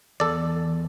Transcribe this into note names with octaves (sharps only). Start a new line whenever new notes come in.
E2 A4 D5